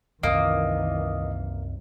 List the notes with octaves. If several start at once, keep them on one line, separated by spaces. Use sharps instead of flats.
C2 F#2 D#3 E3 A#3 D#5 D#6